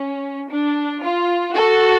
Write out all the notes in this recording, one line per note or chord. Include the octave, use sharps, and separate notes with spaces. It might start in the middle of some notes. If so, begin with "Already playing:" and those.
Already playing: C#4
D4
F4
F#4 A4